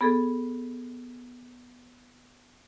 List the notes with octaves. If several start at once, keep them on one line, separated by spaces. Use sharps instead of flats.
B3 G#4 A4